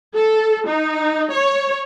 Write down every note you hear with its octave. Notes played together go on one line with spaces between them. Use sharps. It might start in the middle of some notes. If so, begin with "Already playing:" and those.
A4
D#4
C#5